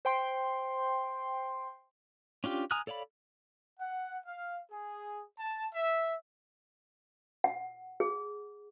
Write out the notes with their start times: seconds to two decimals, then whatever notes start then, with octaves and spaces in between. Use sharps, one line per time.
0.05 C5 G5 C6
2.44 C#4 D4 F4 G4
2.71 G#5 A#5 D#6 F6 F#6
2.87 A4 C#5 D5 F5 B5
3.79 F#5
4.26 F5
4.71 G#4
5.40 A5
5.74 E5
7.44 F#5
8.00 G#4